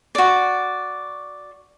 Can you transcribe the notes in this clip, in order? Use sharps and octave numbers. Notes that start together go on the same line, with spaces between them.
F#4 D5